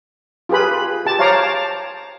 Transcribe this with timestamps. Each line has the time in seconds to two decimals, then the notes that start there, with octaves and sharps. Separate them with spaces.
0.49 F4 G4 G#4 B4 B5
1.06 G4 A5
1.19 C5 C#5 F5 A5 A#5 D6
1.35 A5